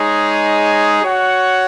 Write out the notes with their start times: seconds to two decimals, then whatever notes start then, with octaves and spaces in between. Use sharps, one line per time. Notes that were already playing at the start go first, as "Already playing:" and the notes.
Already playing: G#3 D#4 G#4 C#5
1.03 F#4 C#5 F#5